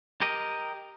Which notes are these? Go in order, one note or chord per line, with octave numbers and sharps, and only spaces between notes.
G4 A#4 D#5